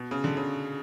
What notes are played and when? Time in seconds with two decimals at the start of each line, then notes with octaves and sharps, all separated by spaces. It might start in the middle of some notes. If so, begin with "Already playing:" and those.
Already playing: B2
0.11 C#3
0.24 D3
0.37 C#3